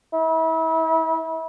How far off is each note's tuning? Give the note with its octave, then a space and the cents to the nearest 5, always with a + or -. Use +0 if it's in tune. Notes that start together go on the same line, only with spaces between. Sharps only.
E4 -35